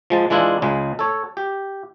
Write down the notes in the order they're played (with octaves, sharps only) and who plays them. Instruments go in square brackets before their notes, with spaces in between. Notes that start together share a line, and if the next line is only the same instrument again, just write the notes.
[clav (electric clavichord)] F3 G#3 A5
E3 G#3 D4 E4 F4
C#2 C#3 G#3
A4 C#5
G4